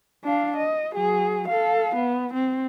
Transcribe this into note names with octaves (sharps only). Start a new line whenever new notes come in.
D4 F5
D#5
F#3 G#4
A4 F5
B3
C4